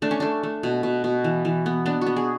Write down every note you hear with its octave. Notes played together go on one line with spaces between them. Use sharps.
A3 D4
C#4
A3 D4
A3
B2
B2
B2
E3
E3
B3
B3 D4
F#4
B3
G#4